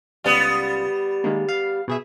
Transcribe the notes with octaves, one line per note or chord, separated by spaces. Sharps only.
C#2 G3 B3 F4
D#3 G#3 A#3
F5
B2 G#4 E5